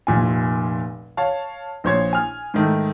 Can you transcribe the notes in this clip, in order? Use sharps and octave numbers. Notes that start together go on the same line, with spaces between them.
F1 A#2 G#5
C#5 F5 A5
A#1 A#2 C5 C#5 G#6
G#5 F6
G#2 D#3 A3